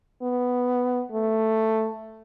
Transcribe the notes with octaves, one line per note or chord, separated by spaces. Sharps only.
B3
A3